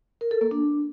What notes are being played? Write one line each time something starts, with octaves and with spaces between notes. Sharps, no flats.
A#4
A4
A#3
D4